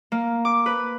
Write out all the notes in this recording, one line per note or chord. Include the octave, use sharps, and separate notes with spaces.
A#3
D6
B4